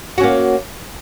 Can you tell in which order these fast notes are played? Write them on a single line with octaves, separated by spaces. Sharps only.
F#4 C#4 A#3